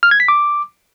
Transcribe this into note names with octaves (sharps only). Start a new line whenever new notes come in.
F6
G#6
B6
D6